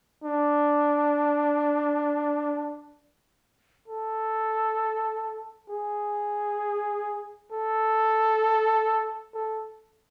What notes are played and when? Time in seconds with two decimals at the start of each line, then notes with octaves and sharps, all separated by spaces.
0.24 D4
3.88 A4
5.69 G#4
7.52 A4
9.34 A4